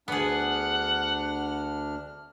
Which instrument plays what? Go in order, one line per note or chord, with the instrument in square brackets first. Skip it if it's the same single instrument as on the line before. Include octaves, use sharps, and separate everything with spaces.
[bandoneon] D2 D4 F6 [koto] B3 G#4 [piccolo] F#5